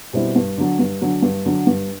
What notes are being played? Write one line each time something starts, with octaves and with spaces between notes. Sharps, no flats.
B2 G3 C4 E4
G2
D3 F#3
G2
D3 F#3
G2
D3 F#3
G2